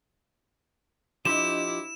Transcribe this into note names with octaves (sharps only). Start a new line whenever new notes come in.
F3 D4 E4 G4 D#5 C6 E7